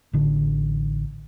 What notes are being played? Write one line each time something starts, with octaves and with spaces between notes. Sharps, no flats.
A1 D3